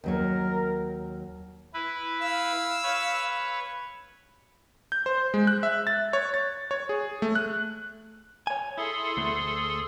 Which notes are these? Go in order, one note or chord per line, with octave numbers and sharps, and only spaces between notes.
D#2 F#3 A#4 C#5
E4 B4
F5 E6
B4 C#5
G6
C5
G#3
F#6
E5
A6
C#5
A6
C#5
G#4
A3
F#6
C#5 G#5
E4 G#4 A4 C6
D2 A3